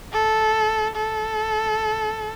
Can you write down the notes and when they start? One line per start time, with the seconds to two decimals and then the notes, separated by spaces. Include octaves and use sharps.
0.13 A4
0.96 A4